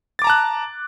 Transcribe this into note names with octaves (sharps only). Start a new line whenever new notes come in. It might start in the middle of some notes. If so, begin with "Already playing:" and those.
A5 A#5 D6 F#6 A6